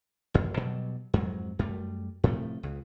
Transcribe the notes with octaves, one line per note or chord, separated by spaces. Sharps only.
A1 F#2
B2 F#3 G3
F2 G#2 F#3
F#2 G3 A3
A2 C3 F3 A3
C#2